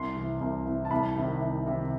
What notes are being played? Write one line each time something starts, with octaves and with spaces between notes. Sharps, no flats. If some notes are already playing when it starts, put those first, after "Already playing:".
Already playing: C2 C6
C3 E3
C2
C3 E3
A5
C2 B5
C3 D#3
C2
C3 D#3